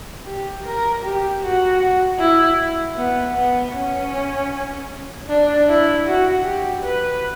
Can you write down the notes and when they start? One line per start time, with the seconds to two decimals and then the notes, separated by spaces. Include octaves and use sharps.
0.26 G4
0.64 A#4
1.03 G4
1.42 F#4
2.19 E4
2.97 B3
3.35 B3
3.73 C#4
5.28 D4
5.68 E4
6.06 F#4
6.44 G4
6.83 B4